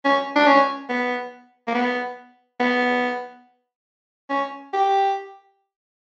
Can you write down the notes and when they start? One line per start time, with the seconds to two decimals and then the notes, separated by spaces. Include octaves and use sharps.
0.05 C#4
0.36 D4
0.47 C#4
0.89 B3
1.68 A#3
1.74 B3
2.60 B3
4.30 C#4
4.73 G4